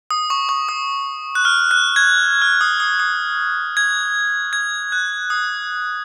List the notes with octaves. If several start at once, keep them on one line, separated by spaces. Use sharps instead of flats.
D#6
C#6
C#6
D#6
F#6
F6
F#6
G#6
F6
D#6
D#6
D#6
G#6
G#6
F#6
D#6